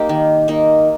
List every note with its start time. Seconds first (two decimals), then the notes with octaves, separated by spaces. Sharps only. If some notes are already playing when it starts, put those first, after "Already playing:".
Already playing: A#3 D#4 G4
0.09 D#3
0.48 A#3 D#4